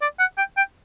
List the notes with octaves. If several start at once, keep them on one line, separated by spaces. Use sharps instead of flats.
D5
F#5
G5
G5